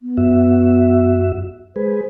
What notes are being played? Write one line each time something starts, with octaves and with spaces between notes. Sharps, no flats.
B3
F#2 F#4 E5
G#3 G#4 B4 C5